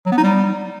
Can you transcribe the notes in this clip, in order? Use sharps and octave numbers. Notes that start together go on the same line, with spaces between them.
F#3
B3
D#4
G3